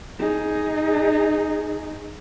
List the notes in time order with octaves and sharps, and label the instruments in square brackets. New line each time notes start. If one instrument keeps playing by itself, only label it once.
[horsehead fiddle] D#4 G#4